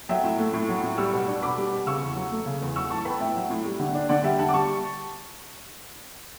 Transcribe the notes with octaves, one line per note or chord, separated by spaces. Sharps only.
F#3 E5 G5
A2
A3
A2
F#3
A2
G3 C#6 E6
B2
D4
B2 B5 D6
G3
B2
C#3 C#6 E6
E2
F#3
A3
C#3
E2
F#3 C#6 E6
A2 A5 C#6
B3 G5 B5
A2 E5 G5
F#3
A2
G3
D3
D4
D3 D5 F#5
G3 E5 G5
D3 F#5 A5
D6
G3 A5 C#6